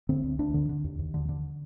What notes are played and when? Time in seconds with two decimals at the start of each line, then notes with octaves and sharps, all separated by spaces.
0.09 D3 C4
0.23 D2
0.39 D2 D4
0.54 D3
0.69 D3
0.84 D#2
0.99 D#2
1.14 D3
1.29 D3